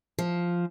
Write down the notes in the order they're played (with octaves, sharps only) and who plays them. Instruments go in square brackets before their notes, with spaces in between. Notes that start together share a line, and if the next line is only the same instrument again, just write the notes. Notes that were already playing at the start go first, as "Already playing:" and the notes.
[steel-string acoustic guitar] F3